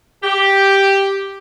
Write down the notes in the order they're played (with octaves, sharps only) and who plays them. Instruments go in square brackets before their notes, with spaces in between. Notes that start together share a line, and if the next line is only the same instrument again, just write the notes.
[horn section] G4